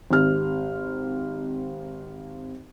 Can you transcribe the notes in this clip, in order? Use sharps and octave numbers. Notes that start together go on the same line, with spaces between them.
G#1 C4 G4 F6